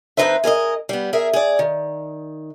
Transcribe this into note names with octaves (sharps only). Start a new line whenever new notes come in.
F2 E3 D#4 B4 C5 E5
G#4 A#4 C5 D#5
G3 B3
G#4 A#4 E5
G#4 D5
D#3